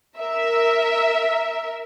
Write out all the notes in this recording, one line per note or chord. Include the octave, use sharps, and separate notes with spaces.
A#4 E5